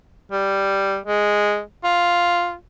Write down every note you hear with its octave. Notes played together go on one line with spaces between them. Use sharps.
G3
G#3
F4